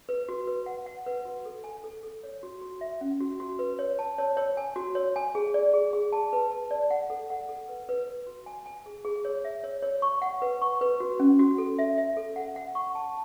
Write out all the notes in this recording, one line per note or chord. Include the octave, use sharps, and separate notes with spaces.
B4
F#4
B4
F#5
F#5
B4
F#4
A4
G#5
A4
A4
C#5
F#4
F#4
E5
C#4
F#4
F#4
B4
C#5
A5
C#5
C#5
G#5
F#4
C#5
G#5
G#4
D5
G#4
G#4
A5
B4
A5
D5
F#5
A4
F#5
A4
B4
B4
B4
F#4
G#5
G#5
G#4
G#4
C#5
E5
C#5
C#5
C#6
F#5
B4
C#6
B4
F#4
C#4
F#4
A4
E5
E5
A4
F#5
F#5
C#6
A5